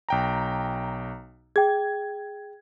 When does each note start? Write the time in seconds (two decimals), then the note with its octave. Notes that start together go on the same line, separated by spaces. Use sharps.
0.09 B1 G5 A#5
1.56 G#4 G5 G#6